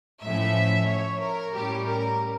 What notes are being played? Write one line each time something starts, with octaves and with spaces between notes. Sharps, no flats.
A2 F3 A3 C#4 E5
C#5
A#4
A2 G3 C#4 G4
A#4